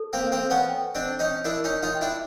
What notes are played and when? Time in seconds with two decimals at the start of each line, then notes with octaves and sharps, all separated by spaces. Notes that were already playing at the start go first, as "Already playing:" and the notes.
Already playing: A4
0.13 A#3 C4
0.19 F5
0.32 A#3 C4
0.44 A4
0.50 B3 C#4
0.69 G5
0.95 C4 D4 D#5
1.19 C#4 D#4 D#5
1.45 D4 E4 A#4
1.64 C#4 D#4
1.70 D#5
1.83 D#4 F4
1.95 G5
2.01 D4 E4